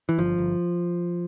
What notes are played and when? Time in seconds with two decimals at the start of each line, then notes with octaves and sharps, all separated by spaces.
0.09 E3
0.18 G1 F3
0.38 G1